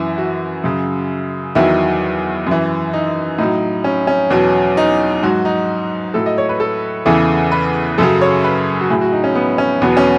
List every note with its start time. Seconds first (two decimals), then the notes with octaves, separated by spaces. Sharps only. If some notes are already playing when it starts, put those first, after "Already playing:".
Already playing: F#2 E3 E4
0.18 F#4
0.64 F#2 C#3 F#3
1.55 E2 D#3 F#3 E4
2.47 F#2 E3
2.93 D#4
3.38 A2 F#3 D#4
3.84 C#4
4.07 C#4
4.30 E2 B2 F#3
4.77 D#4
5.23 G#2 F#3 F#4
5.45 D#4
6.14 A2 F#3 A4
6.26 D#5
6.38 C#5
6.49 B4
6.60 A4
7.06 E2 C#3 E3 A4
7.52 B4
7.98 F#2 C#3 F#3 A4
8.21 C#5
8.44 B4
8.81 F#4
8.90 A2 F#3 G#4
9.01 F#4
9.13 D#4
9.24 C#4
9.35 B3
9.58 C#4
9.82 E2 B2 F#3 B3
9.97 C#4